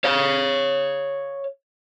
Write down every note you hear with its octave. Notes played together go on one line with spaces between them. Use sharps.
C#5 F5